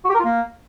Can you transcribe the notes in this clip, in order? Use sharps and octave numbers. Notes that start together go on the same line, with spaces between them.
F#4
G4
A#4
F4
A#3